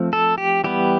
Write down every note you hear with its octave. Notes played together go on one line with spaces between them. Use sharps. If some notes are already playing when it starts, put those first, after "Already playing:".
Already playing: F3 A3 C4
A4
G4
E3 G3 B3 G4